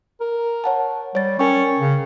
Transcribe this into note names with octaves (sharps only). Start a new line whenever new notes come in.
A#4
C#5 F#5 A5
G3 C#5 A6
C#4 A#4 G5 C#6
C#3